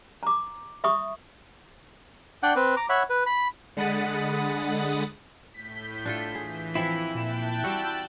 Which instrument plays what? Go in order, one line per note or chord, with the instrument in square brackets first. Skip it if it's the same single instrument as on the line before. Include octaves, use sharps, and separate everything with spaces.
[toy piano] A#5 D6
E5 B5 C#6 D#6
[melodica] D4 D5 F#5 G5
C4 B4
A#5 D6
C#5 E5 F#5 B5
B4
B5
[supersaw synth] D3 G#3 F#5 B5 D#6 A6
[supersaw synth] A2 G6 [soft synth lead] B6
[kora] D4 F4 A4
[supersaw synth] E3 [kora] G#4
[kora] F3 C4 [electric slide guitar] E4
[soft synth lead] A#2 [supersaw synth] G5 A5 F#6
[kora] G3 F#4 [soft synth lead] E6